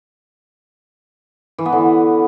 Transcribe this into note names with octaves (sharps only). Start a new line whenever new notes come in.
E3
B3
D3